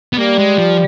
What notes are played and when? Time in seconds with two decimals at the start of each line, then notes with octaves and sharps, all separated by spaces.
0.13 B3
0.18 G3 A#3
0.38 G#3
0.58 F3